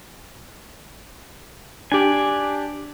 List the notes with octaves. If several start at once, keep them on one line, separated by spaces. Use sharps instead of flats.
D4 G4 D5 G#5